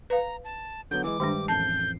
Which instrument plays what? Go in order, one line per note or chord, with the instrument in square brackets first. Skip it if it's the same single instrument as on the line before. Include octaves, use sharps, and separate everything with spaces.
[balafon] B4 F5 [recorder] A#5
[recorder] A5
[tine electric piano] D3 F#3 B3 [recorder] G6
[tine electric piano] E3 G#3 [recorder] D6
[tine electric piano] G2 G4 [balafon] D#3 G#3 D4
[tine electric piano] A1 F2 C7 [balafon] A5 [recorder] G6